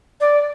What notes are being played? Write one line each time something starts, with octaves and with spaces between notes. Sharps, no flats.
D5